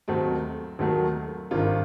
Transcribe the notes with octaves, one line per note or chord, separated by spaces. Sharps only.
D#2 D#3 F#3 A3 C4
D#2 D#3 F#3 A3
G#1 G2 D#3 F4